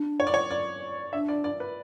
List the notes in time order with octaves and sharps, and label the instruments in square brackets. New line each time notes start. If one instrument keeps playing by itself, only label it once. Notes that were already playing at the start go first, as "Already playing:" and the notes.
Already playing: [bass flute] D4
[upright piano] C#5
D5
C#5
D5
[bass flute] D4 [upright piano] E5
[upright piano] D5
D5
B4